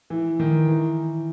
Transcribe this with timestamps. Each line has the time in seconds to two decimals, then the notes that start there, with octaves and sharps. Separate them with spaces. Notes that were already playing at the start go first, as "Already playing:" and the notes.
0.10 E3
0.39 D#3
0.68 E3